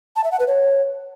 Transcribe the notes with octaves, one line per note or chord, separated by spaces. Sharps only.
A5
E5
F#5
B4
C#5